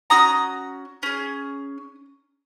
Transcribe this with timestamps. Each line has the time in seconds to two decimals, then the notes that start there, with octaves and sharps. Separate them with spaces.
0.10 C#4 F#4 A#5 D#6
1.03 C#4 G#4